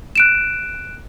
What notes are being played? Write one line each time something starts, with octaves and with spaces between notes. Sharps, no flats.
F#6 D7 E7